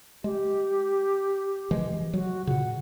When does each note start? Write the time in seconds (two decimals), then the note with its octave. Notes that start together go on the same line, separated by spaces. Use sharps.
0.24 G#3 G4
1.71 E3 F3 G#3
2.14 F#3 F#4
2.47 A#2 C#3 F#5